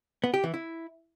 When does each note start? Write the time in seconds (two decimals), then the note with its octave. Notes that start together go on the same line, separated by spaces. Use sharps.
0.24 B3
0.34 G4
0.44 E3
0.54 E4